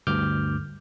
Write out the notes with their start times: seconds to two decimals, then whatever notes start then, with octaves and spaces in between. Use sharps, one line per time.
0.07 D2 G2 D6 F6 G6